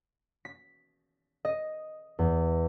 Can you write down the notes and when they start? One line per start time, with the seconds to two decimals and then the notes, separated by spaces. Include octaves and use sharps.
0.45 B6
1.45 D#5
2.19 E2